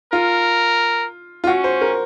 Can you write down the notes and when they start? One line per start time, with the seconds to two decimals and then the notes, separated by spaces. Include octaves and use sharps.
0.13 F4 A#4
1.44 F4
1.47 C#4 F#4
1.64 C5
1.81 A#4